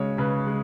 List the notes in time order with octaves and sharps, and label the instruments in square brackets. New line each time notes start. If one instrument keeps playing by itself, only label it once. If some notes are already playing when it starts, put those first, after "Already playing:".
Already playing: [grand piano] C#3 G#3 C#5
C#3 B4
G#3